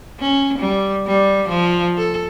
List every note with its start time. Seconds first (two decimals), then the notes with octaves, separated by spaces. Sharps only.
0.20 C#4
0.59 G3
1.07 G3
1.49 F3
1.97 A4